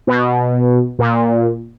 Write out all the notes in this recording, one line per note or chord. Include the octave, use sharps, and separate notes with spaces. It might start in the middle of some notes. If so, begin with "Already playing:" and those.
B2
A#2